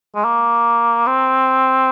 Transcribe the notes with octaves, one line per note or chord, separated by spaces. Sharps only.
G#3
A#3
C4